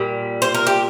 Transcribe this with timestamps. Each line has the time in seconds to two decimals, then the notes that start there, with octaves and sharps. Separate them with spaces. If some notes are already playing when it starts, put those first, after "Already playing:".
Already playing: A#2 G3
0.42 C5
0.55 A#4
0.67 G4